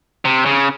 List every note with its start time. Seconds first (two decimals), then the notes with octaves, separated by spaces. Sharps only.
0.25 C3
0.46 C#3